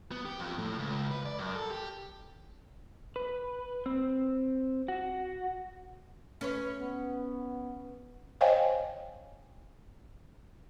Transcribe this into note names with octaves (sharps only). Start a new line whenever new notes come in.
B3
G4
F2
A2
C#2
B4
D5
F#2
A4
G4
B4
C4
F#4
C#4 B4 C#5
B3
C5 C#5 D#5 F5 G5 G#5